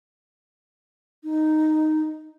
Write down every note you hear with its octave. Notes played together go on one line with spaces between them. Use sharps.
D#4